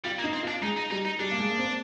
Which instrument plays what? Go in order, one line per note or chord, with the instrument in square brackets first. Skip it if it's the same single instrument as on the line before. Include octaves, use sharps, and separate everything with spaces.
[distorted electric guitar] G3 [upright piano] F4
[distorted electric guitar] A#3
[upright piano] D#4
[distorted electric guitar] C4
[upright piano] F4
[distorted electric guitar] D4
[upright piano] G#3 [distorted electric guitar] D#4
[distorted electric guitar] D#4
[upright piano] G3 [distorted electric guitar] D#4
[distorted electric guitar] D#4
[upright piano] G3 [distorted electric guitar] D4
[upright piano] A#3
G#3
A#3
C4